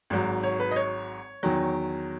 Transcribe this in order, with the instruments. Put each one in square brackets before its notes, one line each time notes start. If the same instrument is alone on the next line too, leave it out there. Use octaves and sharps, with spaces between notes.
[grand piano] G#1 G#2 F#3
C#5
B4
D#5
C#5
E2 D#3 F#3